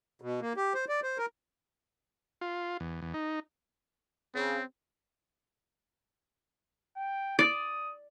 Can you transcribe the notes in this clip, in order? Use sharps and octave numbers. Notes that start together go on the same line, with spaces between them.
B2
A#3
G4
C5
D5
C5
A#4
F4
E2
E2
D#4
C#3 C4
G5
D5 D#6